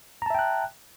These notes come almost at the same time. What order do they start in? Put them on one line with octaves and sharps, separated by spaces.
A#5 A5 E5 G5 F#6